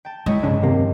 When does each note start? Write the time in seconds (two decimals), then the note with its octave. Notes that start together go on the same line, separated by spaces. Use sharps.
0.05 G5 A5
0.26 G#3 E4 C#5 D#5
0.43 F1 G2 A#2 C#3 D4
0.63 D#2 C3 A#3